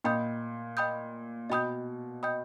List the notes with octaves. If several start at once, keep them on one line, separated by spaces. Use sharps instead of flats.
A#2 D#5 G5 B5 D#6 G6
D#5 G5 B5 D#6 G6
B2 D#5 G5 B5 D#6 G6
D#5 G5 B5 D#6 G6